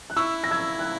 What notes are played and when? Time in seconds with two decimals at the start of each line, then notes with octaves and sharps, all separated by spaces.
0.10 F#6
0.16 E4 C#6 E6
0.44 A#6
0.51 E6 G#6
0.79 F#6